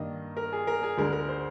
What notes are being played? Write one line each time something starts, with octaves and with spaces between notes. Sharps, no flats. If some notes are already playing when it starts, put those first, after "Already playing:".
Already playing: G2 D#3 A#3 D#5
A#4
G#4
A#4
G#4
D2 D3 G#3 A#4
A#4
C5